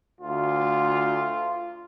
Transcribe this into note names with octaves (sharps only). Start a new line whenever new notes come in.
D2 F4